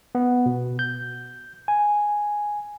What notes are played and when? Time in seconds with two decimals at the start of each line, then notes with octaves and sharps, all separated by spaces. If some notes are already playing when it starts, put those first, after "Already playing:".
0.15 B3
0.46 B2
0.79 G6
1.68 G#5